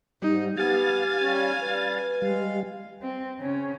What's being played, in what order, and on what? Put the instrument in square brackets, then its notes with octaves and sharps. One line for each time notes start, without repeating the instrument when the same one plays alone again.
[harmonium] G#2 [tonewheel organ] G3 [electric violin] D#4
[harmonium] B3 [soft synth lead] G4 [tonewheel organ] F5 A6 [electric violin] G#5
[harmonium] G3 C#4
[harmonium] G3 [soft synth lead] B4
[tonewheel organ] G3 [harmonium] G#3 F5
[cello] C4
C#3 C#4